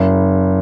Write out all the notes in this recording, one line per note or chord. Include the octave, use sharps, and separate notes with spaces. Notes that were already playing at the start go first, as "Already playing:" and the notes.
Already playing: F#1